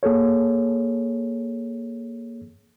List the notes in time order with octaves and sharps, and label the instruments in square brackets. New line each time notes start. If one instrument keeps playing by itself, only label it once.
[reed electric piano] A#3 G#4 A4 C#5